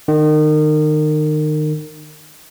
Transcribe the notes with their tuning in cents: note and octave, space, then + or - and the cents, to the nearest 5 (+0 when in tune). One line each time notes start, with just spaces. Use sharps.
D#3 -30